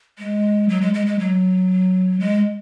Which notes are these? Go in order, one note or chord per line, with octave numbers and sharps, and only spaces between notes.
G#3
F#3
G#3
G#3
G#3
F#3
G#3